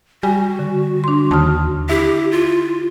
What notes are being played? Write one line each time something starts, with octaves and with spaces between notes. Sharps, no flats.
G3 F#4 G#5
D3
D4 C6
D#2 A5 D#6 F6
E4 G4
F4